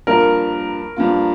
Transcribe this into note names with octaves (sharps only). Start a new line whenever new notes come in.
G2 F3 A#3 F4 A#4
G2 F3 A#3 F4